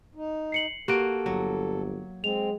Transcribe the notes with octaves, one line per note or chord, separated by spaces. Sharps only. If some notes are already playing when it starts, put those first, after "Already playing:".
D#4
C7 C#7 F#7
A#3 F#4 G4 A4 D7
G1 F#3
G#3 C4 F7